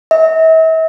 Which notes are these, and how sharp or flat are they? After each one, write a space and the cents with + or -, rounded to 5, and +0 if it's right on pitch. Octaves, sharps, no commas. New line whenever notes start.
E5 -40